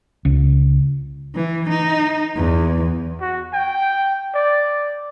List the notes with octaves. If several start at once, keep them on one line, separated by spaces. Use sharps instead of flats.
C#2
E3
D#4
E2
F#4
G5
D5